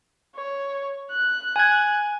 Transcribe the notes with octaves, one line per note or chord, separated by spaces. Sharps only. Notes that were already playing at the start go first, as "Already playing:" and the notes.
C#5
F#6
G#5 G#6